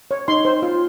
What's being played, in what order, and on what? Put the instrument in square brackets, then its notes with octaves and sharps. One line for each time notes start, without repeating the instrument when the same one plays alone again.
[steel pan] C#5
D#4 C6
C5
F4